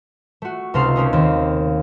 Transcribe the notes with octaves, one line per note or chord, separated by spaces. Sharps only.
A3 F#4
C#2 C3 D#4 A4 F5 C6
A3 A#3 C#4 D#4
D#2 C4